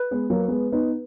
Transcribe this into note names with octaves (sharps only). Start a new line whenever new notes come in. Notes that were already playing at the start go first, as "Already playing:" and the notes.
Already playing: B4
G#3 B3
F#3 A#3
G#3 B3
B3 D#4